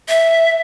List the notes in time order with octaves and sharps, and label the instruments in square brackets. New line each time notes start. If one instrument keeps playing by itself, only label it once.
[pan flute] E5